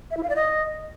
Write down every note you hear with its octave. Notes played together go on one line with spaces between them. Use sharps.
E5
E4
F5
D5
D#5